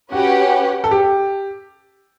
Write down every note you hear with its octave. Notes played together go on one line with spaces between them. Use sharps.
C#4 F#4 G4 B4 F#5
A4
G4